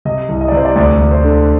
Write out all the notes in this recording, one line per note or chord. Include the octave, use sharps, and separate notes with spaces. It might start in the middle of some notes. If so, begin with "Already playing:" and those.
C3 D#5
C2
D#5
D5
C3 C5
D5
D2 D5
D2
C5
D3